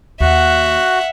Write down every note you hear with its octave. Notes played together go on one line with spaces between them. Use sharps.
D#2 F#4 E5 F#5